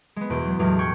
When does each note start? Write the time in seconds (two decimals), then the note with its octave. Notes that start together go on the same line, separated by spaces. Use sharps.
0.16 G#3 B3
0.30 E2 B2 G6 D7
0.45 F#3
0.59 E2 A2 F#3 G#3 G4 F6
0.79 F#5 G5 C#6 G6 G#6